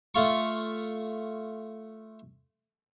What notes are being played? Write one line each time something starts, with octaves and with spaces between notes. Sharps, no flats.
A3 F4 C#6